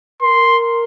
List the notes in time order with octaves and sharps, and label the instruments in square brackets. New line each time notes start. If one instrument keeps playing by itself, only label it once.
[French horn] A#4 [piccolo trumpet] C6